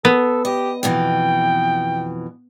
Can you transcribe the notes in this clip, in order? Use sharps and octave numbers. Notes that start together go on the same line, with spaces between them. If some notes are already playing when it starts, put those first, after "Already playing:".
B3 A4
G4 D#5
F2 B2 E3 G5